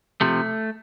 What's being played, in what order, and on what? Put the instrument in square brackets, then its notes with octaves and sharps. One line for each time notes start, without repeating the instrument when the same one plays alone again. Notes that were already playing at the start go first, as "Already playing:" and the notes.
[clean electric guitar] C3 F3 A3